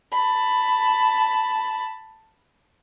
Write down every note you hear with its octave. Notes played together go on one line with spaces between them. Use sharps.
A5 B5